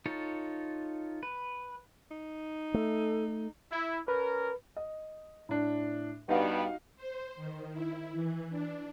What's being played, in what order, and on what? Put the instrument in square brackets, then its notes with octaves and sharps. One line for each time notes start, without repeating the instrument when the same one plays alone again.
[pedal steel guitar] D#4 F4 A4 C#5
B4
[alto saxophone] D#4
[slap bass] A3 [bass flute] A4
[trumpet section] E4
[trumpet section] C#4 A#4 [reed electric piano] B4
[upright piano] D#5
A2 D4
[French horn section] G2 G3 B3 [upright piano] D#4 F#4 F5
[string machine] C5
D#3
E4
E3
D4